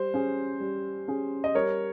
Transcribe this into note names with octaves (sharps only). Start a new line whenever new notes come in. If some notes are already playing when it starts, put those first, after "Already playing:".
Already playing: G3 C5
C#4 G#4
G3
C#4 G#4
D#5
G3 A#4 C#5